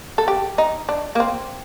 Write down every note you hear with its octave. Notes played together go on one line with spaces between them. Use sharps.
A4
G4
D#4
D4
A#3
C4